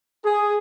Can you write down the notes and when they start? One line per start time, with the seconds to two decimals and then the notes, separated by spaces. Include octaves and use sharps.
0.25 G#4